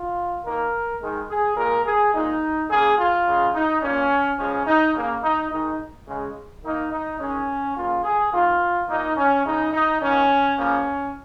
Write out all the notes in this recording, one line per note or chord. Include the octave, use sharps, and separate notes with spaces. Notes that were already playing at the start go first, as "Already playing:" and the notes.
Already playing: F4
D#3 A#3 A#4
D#3 G#3
G#4
A#2 G#3 A#4
G#4
A#2 G#3 D#4
C#3 A#3 G#4
F4
C#3 G#3
D#4
A#2 A#3 C#4
C#3 F3 G#3 C#4
D#4
C#3 A#3
D#4
D#3 G#3 D#4
C#3 G#3
D#3 A#3 D#4
D#4
D#3 G#3 C#4
C#3 A#3 F4
G#4
D#3 A#3 F4
A#2 A#3 D#4
C#4
C#3 G#3 D#4
D#4
D#3 A#3 C#4
C#3 F3 A#3 C#4